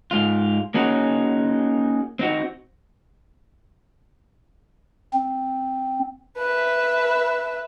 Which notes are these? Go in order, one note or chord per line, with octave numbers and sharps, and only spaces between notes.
G#2 F4
A#3 C#4 D#4 F#4 G#4
C4 D#4 F#4
C4
B4 E5